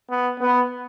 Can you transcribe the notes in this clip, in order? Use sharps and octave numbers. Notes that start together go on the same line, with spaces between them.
B3
B3